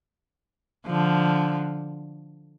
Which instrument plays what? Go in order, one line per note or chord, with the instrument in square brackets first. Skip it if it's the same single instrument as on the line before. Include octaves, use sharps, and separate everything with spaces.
[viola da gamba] D3 F3